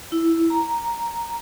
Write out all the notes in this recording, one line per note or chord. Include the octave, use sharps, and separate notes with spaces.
E4
A#5